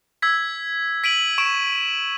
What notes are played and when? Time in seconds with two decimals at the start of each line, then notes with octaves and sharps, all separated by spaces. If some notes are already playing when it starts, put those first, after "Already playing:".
0.22 E6 G#6 B6
1.04 B6 D7 D#7 F#7
1.38 C#6 D7 E7